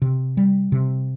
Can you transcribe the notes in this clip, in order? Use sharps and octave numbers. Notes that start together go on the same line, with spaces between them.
C3
G3
C3